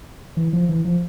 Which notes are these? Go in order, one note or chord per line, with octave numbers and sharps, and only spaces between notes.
E3
F3
E3
F3